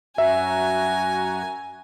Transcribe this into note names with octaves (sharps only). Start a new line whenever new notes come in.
F#2 F#4 E5 G#5 A#5